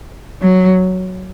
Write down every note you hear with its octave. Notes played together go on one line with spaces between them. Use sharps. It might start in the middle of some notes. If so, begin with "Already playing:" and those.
F#3